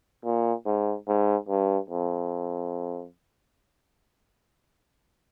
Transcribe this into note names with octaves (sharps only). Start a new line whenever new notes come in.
A#2
G#2
G#2
G2
F2